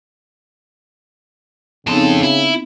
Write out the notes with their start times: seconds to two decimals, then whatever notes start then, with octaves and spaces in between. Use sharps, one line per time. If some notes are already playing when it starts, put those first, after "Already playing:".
1.87 F2 C#3 B3 C4 D#4 A4
2.23 E4